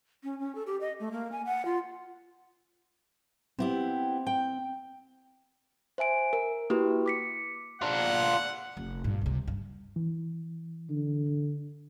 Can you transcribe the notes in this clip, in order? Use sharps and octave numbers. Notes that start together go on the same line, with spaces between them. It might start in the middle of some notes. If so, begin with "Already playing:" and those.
C#4
C#4
A4
G4
D#5
A3
A#3
G#5
F#5
F4
B3 C4 E4 G4
G5
C5 E5 G#5 D7
A#4
A#3 E4 F#4 G4 B4
D6 B6 C#7
D4 F4 F#5
F1
G2 A#2
C#2 C3
G2
E3
D3